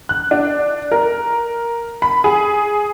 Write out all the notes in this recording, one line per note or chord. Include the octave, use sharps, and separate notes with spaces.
F#6
D4
A#4
B5
G#4